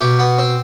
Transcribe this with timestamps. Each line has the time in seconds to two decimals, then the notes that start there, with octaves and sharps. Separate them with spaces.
0.01 B2 G4
0.19 B3
0.38 C4